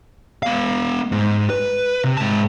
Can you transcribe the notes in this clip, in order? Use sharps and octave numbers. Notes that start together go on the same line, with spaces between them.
B3 F5
G#2
B4
C3
G#2 A5